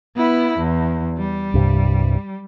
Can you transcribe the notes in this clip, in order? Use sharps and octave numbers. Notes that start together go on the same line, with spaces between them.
B3 E4
E2
G3
C2 G2 C3